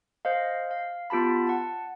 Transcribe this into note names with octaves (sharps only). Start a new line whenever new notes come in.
C5 D#5 F5
F5
B3 F4 G4 A5 B5
F#5 A5